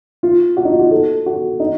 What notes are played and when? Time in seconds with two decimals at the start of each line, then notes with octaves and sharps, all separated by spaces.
0.23 F4
0.57 F#4
0.65 D#4
0.73 F4
0.79 F#4
0.91 A4
1.26 F#4
1.60 D#4